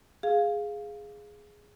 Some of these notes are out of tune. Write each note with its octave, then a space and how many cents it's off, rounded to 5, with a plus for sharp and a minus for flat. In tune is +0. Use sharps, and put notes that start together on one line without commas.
G#4 +0 F5 +0